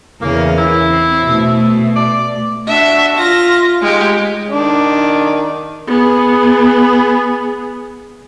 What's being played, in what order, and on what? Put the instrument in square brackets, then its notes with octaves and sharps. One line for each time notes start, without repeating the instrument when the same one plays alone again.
[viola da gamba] E2 C#3 A#4 [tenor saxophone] A#3
[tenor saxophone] E4
[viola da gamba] C4
B2 A3
[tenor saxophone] D5
[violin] D4 F#4 [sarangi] E5
[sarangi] F4 [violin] A#6
[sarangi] G#3 [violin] D#4 G4
[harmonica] D#3 D4
[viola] B3 G#4